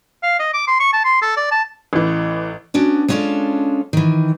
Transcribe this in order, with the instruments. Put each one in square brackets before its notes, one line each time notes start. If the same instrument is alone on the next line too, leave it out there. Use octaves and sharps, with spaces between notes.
[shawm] F5
D#5
D6
C6
C#6
A5
C6
A4
D5
A5
[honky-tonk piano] A1 E3
[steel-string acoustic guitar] B3 C#4 D4 F#4
G#3 B3 C#4 D4 F4 A4
D#3 E3